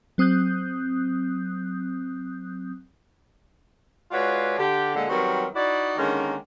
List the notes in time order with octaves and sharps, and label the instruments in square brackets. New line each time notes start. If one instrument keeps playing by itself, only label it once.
[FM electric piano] F#3 C4 D#6 F#6 G6
[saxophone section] G#3 F4 F#4 B4 C#5 D5
D3 G4
A#2 D3 G#3
D#3 F#3 G3 B3 C4 A#4
D#4 E4 F#4 D5
D3 D#3 G#3 A#3 C#4